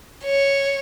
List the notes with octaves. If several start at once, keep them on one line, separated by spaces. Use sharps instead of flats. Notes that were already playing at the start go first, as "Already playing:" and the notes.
C#5